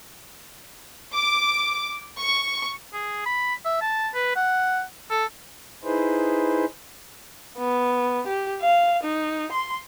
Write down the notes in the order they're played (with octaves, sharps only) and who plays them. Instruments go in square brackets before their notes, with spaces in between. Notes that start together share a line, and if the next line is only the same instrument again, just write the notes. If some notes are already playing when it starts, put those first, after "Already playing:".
[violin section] D6
C#6
[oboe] G#4
B5
E5
A5
B4
F#5
A4
[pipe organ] D#4 E4 G#4 B4 C5
[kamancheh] B3
G4
F5
D#4
C6